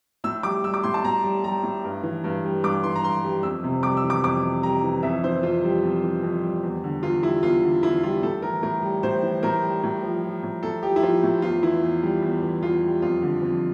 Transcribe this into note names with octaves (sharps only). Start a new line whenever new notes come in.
A2 E6
G3 D6
G3 E6
D6
A2 C6
A5
A2 A#5
G3
G3 A#5
A2
G2
E3
G2
G3
G2 D6
E3 C6
A#5
G2 C6
G3
F2 E6
C3
G3 D6
E6
E3
D6
F2 D6
C3
G3 A#5
E3
F2 E5
E3 C5
F2 F4
G3
F2
E3
F2
G3
E2
D3
E2 F4
G3 E4
E2 F4
D3
E2 E4
G3 F4
A2 A4
E3 A#4
A2 A#4
G3
A2 C5
E3
A2 A#4
G3
A2
F3
F3
A2
A2 A4
F3 G4
E4
F3 F4
A2
E2 F4
E3 E4
E2
G3
E2
E3
E2 F4
G3
F2 F4
D3
F2